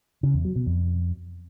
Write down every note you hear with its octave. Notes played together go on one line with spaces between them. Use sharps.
C#3
E2
F#3
B2
F2